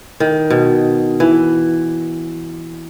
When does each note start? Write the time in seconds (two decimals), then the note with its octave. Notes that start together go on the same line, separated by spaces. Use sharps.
0.20 D#3
0.50 B2
1.20 E3